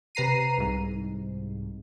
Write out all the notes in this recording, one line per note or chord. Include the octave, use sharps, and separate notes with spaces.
C3 B4 A#5 C7 D#7
C2 G#2